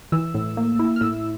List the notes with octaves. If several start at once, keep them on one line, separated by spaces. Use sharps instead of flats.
E3 E6
A2
A#3
E4
F6
A2 E6